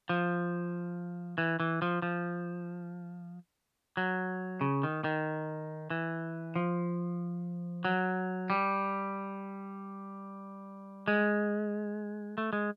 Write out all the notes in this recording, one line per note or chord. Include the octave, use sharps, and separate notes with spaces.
F3
E3
E3
F3
F3
F#3
C#3
D#3
D#3
E3
F3
F#3
G3
G#3
A3
G#3